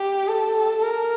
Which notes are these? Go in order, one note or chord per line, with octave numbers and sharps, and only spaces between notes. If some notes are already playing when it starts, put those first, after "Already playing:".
Already playing: G4
A4
A#4